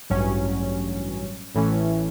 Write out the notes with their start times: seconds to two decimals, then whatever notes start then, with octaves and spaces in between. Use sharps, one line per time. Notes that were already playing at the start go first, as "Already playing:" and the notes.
0.10 A1 G2 F#3 C#4
1.55 A1 A2 E3 A3 C#4